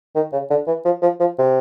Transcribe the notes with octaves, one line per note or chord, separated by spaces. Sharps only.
D#3
C#3
D3
E3
F3
F3
F3
C3